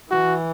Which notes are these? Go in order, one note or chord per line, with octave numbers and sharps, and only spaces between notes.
E3 F#4